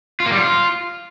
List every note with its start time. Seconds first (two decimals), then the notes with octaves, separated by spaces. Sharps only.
0.20 F4
0.26 A#3
0.32 G3
0.38 F4